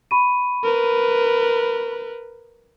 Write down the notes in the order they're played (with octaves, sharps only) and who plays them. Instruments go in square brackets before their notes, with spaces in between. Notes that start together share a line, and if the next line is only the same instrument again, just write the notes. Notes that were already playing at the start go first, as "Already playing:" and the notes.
[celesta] B5 C#6 D#7
[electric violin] A#4 B4